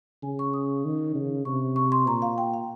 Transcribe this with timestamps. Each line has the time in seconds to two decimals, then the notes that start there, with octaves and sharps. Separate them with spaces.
0.23 C#3 G#5
0.39 C#6
0.54 D#6
0.85 D#3
1.15 C#3
1.45 C3 C#6
1.76 C#6
1.92 C6
2.07 A#2 A#5
2.22 F5
2.38 G5
2.54 F5